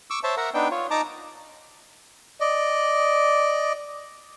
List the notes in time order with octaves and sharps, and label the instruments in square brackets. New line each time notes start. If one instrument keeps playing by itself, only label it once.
[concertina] C#6 D6 E6
C5 C#5 E5 A5
A#4 E5 F#5 A#5
B3 D4 D#4 G5
F4 C#5
D#4 A5 A#5 D6
[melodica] D5 D#5